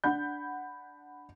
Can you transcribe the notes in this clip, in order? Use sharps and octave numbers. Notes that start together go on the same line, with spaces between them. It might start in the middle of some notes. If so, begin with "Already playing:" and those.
D4 F#5 B5 G6